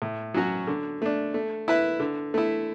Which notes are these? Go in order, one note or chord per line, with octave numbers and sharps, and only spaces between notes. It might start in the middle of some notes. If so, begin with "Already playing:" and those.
A2
F#3 C#4 F#4
D3
A3 D4
A3
E4 B4 E5
D3
A3 E4